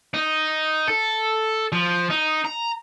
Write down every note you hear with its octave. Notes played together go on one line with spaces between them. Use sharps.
D#4
A4
F3
D#4
A#5